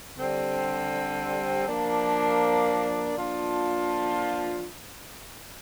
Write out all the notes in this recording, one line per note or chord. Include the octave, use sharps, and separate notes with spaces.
D3 G3 C4
F3 A#3 D4
F3 A#3 D4 F4